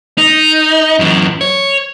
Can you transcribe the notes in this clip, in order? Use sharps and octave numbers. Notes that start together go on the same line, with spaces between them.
D#4
F#2 E3
C#5